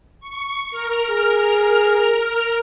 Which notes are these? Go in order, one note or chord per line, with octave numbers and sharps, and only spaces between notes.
C#6
A#4 F6
G#4